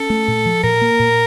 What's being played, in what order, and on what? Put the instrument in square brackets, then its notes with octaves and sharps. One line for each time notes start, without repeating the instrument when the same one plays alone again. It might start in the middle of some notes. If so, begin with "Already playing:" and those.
Already playing: [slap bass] C#4 [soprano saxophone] A4
[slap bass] A3
A#2
F3
[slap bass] A#2 [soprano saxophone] A#4
[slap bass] A#3
A#2